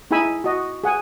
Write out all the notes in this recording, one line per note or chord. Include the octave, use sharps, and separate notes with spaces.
D#4 E4 G#4 G#5 B5 E6
F#4 D#5
G#4 F#5 G#5